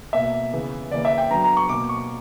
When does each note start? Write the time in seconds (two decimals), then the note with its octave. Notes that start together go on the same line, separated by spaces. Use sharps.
0.13 B2 A#3 E5
0.52 C#3 E3 B3
0.91 C#3 E3 A#3 D5
1.05 E5
1.18 G5
1.31 D3 F#3 B3 A#5
1.44 A#5
1.57 C#6
1.69 B2 A#3 D6
1.89 C#6